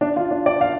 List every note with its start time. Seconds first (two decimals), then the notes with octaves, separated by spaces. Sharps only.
0.01 D4
0.16 F4
0.31 D4
0.46 D5
0.61 F5